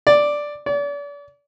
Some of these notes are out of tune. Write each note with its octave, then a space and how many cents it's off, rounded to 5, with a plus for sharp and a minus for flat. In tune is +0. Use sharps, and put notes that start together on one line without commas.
D5 +0
D5 -40